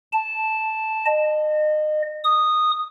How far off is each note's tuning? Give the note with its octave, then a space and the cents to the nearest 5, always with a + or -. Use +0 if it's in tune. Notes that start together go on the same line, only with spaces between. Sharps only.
A5 -5
D#5 -30
D#6 -10